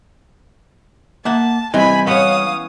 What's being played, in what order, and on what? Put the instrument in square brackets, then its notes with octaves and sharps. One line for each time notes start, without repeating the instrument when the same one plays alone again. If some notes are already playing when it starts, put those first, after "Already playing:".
[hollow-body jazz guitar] A#3 E5 F#5 [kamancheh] A5
[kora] E3 [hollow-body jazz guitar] G3 C4 D#5 [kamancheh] G#5 B5
[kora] B3 C#4 C#5 [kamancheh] F5 D#6